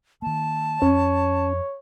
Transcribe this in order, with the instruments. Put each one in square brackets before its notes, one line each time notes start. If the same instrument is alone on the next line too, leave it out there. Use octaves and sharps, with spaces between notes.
[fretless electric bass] D#3 A#3 [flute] A5
[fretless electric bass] F2 [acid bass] C#4 [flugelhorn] C#5